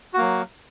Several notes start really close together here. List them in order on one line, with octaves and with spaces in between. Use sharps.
F#4 A#3 F#3